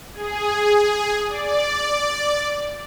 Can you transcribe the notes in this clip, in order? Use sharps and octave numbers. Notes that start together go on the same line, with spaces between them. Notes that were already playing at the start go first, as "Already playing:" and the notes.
G#4
D5